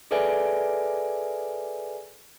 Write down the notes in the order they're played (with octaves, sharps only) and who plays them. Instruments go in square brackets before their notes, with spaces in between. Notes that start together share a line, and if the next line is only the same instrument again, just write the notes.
[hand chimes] G#4 A4 B4 D5 E5 G#5